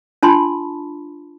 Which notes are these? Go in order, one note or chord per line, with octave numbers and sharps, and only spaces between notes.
D4 F4 A5 B5 C6